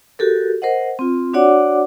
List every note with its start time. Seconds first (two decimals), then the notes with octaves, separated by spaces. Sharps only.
0.19 F#4 G4 A4 A#4
0.62 A#4 C5 D#5 F#5
0.99 C4 F4
1.34 D4 F#4 C#5 D5 F#5 D6